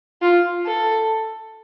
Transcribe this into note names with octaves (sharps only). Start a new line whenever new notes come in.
F4
A4